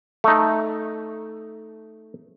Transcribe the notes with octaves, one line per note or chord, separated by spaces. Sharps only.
A3 D#4